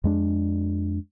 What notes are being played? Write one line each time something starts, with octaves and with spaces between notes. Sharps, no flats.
F2 G#3 D4